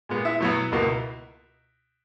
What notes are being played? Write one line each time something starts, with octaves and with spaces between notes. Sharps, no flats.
A#2 G#3 B3
E4 E5
B2 F#3 B3
C#2 B2 A#3